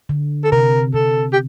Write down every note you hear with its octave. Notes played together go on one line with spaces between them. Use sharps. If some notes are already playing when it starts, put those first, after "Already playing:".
D3
A4
C3 A#4
C3 A4
G4